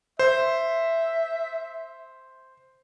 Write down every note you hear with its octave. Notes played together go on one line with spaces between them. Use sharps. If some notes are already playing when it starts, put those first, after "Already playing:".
C5 E5